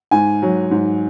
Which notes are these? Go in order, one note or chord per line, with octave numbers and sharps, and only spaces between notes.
G#2 G#5
F#3
G#2